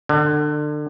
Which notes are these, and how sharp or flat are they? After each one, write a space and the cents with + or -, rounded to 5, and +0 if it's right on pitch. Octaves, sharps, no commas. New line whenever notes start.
D3 +30